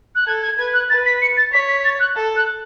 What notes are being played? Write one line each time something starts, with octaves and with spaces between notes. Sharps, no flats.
F#6
A4 G#6
G#6
B4 G#6
F#6
B4 A6
B6
C#7
A6
C#5 B6
B6
A6
F#6
A4
F#6